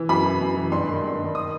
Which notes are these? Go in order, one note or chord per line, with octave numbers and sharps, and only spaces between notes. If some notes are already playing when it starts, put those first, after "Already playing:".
Already playing: E3
F#2 B5
E3
F#2
E3
G2 C6
D#3
G2
D#3
D#6